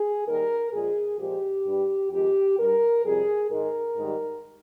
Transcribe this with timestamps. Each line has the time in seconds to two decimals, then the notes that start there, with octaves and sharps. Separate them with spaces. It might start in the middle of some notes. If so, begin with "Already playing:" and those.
Already playing: G#4
0.26 D#2 D#3 G3 A#4
0.73 A#2 F3 G#3 G#4
1.18 A#2 F3 G#3 G4
1.65 G2 G3
2.11 F2 D#3 G#3 G4
2.58 G2 G3 A#4
3.04 F2 C3 G3 G#4
3.50 G#2 D#3 G#3 A#4
3.96 G#2 D#3 G3